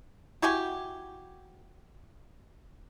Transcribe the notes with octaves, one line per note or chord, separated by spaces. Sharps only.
E4 F#4 G4 G#5